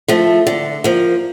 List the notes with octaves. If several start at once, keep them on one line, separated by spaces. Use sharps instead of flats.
F3 A3
D3
F3 A#3